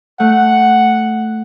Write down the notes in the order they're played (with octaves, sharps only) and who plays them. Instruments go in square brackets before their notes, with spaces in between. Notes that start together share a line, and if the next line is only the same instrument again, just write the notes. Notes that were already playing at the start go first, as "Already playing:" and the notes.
[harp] A3 [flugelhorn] F#5